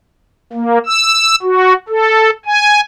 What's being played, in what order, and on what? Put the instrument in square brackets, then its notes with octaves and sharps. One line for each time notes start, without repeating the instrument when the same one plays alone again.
[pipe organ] A#3
E6
F#4
A4
G#5